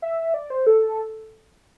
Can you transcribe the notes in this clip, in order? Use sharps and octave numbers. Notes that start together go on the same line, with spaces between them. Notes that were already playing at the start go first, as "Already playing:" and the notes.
E5
D5
C5
A4